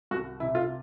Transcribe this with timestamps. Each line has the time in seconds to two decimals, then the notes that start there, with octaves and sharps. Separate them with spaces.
0.11 C2 F#4
0.40 C3 E4
0.55 F4